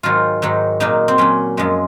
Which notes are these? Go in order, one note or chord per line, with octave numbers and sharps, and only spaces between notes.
G#2 D#3 F#3 F4
G#2 D#3 F#3
A#2 F#3 D#4
C4
A#2 F#3 C#4
F#2 F3 G#3